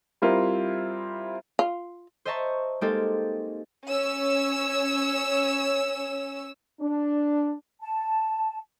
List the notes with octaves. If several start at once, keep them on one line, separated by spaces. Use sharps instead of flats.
G3 C4 E4 F4 A#4
F4
C5 D#5 E5 A5 A#5 C#6
G#3 A#3 C4 D#4 G4 A4
C#4 C#5 E6
D4
A5